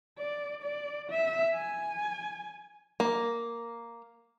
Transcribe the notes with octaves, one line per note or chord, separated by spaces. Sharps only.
D5
D5
E5
G#5
A#3